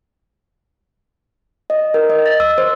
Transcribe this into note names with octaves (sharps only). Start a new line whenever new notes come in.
D#5
A#4
D#5
A6
E6
C5